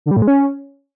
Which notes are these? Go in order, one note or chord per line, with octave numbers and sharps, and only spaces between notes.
D3
G3
A2
G#3
C#4